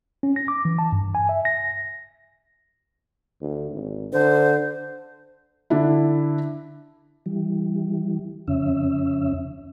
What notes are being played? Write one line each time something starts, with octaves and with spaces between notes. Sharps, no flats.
C#4
A#6
D6
E3
A5
G2
G#5
E5
A#6
D2
G#1
D3 C5
D3 D4 E4
E3 G3
F2 C#3 C#4 E5